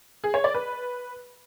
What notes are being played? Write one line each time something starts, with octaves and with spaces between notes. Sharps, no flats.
G#4
C#5
D5
B4